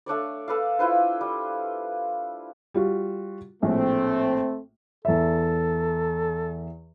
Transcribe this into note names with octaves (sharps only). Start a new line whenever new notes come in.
A3 D4 C#5 D5
A4 B4 D5 F5
E4 F4 B4 C5
G3
G3 F4 F#4
A#1 A2 A3 C4
E2 A4 E5